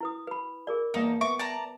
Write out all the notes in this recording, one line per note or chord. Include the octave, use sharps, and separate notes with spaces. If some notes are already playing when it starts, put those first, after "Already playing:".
E4 B4 D#6
B4 B5
G#4 A#4 D5
E2 A#3 D#4 A5
B3 E5 C#6 D6
D5 G5 A5 A#5